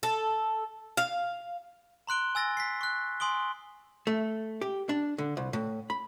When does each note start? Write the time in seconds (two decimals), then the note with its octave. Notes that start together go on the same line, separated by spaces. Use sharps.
0.03 A4
0.97 F5
2.07 A#5 C6 F#6 D7 G7
2.35 G#5 E6 A6 A#6
2.57 B6 C7
2.81 C#6 F#6
3.20 G#5 C6 D#6 D7 G7
4.07 A3
4.61 G4
4.89 D4
5.18 D3
5.37 C2
5.53 A2
5.90 B5